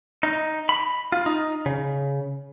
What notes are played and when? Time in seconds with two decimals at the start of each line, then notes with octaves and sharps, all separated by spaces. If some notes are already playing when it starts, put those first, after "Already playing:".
0.23 D#4
0.69 B5
1.12 F4
1.26 D#4
1.66 C#3